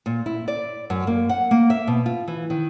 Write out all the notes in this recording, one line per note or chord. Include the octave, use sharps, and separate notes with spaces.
A#2
E4
D5
F#2
A#3
F#5
A#3
E5
B2
F4
E3
D#3